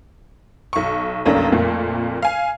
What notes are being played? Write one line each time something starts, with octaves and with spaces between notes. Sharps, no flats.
B1 C#6
F1 B1 A#3 C#4 D4 A#5
F2 A#2 A3 A#3
F5 G#5